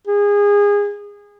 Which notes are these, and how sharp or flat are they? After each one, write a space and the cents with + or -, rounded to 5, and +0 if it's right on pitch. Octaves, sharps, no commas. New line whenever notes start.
G#4 -25